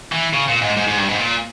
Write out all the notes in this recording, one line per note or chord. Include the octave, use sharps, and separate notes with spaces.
E3
C#3
A#2
G#2
G#2
G#2
G2
G#2
A#2